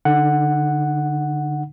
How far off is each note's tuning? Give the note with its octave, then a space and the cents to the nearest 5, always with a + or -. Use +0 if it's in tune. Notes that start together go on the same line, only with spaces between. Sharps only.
D3 +0 D#4 -25 F#5 +0